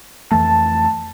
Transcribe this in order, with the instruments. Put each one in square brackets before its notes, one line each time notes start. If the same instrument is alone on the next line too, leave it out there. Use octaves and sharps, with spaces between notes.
[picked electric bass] F2 E3 A3 [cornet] A5